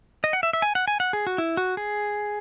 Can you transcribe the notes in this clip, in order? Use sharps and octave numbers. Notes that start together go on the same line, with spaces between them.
D#5
F#5
E5
E5
G#5
F#5
G#5
F#5
G#4
F#4
E4
F#4
G#4